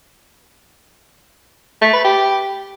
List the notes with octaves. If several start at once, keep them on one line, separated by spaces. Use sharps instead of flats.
A3
B4
G4